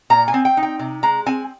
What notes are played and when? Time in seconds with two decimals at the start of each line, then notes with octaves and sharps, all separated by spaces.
0.10 A#2 A#5
0.28 G#5
0.34 C4
0.45 G5
0.57 D#4
0.63 G5
0.79 C3
1.03 G#3 A#5
1.26 C4 G#5